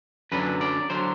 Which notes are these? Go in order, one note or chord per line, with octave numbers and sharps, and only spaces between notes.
F#2 D3 F#3 B4
D5
D3 F#3 C5